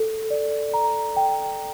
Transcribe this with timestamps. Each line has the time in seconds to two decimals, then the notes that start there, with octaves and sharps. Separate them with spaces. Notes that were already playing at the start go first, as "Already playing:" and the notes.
Already playing: A4
0.30 D5
0.74 A#5
1.17 G5